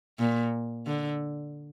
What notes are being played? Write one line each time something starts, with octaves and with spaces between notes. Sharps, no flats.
A#2
D3